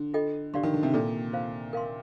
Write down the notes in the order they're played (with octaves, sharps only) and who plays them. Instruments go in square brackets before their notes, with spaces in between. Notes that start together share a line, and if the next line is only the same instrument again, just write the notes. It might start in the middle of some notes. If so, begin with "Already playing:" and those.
Already playing: [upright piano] D3
[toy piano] F4 A4 D#5 G5
[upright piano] D3 [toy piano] G4 D5 F5 C6
[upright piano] D#3
D3
C3
[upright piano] A#2 [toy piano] A4 D5 A5
[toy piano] F4 C5 F5
A#4 F5 C6